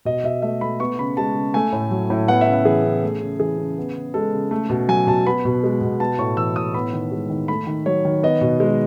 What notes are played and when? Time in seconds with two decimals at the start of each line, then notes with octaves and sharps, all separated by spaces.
0.05 B2 D#5
0.24 B2 E5
0.42 A3 E5
0.61 A3 B5
0.80 B3 C#6
0.99 C#3 B5
1.17 G#3 A5
1.35 C#3
1.54 A3 G#5
1.73 A2
1.91 F#3
2.10 A2
2.28 B3 F#5
2.41 E5
2.47 C#3
2.53 F#5
2.65 E3 G#4
2.85 C#3
3.03 A3
3.22 C#3
3.40 E3 G#4
3.58 C#3
3.78 B3
3.96 C#3
4.14 G#3 A4
4.34 C#3
4.51 A3
4.70 B2
4.88 F#3 G#5
5.07 B2 A5
5.27 B3 B5
5.45 B2
5.64 G#3
5.81 B2
6.00 B3 A5
6.19 A2 C#6
6.37 E3 E6
6.55 A2 D#6
6.74 B3 B5
6.93 D#3
7.12 G#3
7.30 D#3
7.48 A3 B5
7.67 D#3
7.86 F#3 C#5
8.05 D#3
8.23 B3 D#5
8.41 B2
8.60 G#3